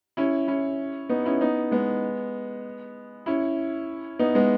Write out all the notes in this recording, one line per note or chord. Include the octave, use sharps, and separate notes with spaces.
C#4 E4
C#4 E4
B3 D#4
C#4 E4
B3 D#4
G#3 B3
C#4 E4
B3 D#4
G#3 B3